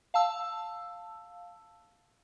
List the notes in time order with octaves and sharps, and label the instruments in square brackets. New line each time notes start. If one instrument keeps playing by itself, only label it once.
[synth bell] F5 A5 E6